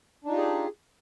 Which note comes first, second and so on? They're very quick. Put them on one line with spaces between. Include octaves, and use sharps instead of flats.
D4 D#4 F4 G4 G#4